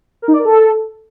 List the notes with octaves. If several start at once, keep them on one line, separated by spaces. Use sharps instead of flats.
A#4
D#4
D5
A#4
A4